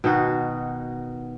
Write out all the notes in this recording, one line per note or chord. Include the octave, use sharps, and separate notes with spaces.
B2 D#3 D#4 F#4